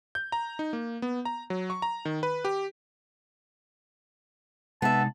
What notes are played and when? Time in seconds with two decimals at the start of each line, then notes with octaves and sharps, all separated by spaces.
0.15 G6
0.32 A#5
0.59 D#4
0.73 A#3
1.02 B3
1.25 A#5
1.50 F#3
1.70 C#6
1.82 A#5
2.05 D#3
2.23 B4
2.45 G4
4.82 C3 G#3 B3 D#4 E5 A5